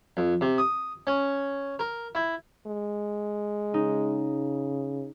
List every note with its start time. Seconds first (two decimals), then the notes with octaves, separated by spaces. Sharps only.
0.17 F2
0.41 C3
0.58 D#6
1.07 C#4
1.79 A#4
2.15 E4
2.66 G#3
3.74 C#3 D#4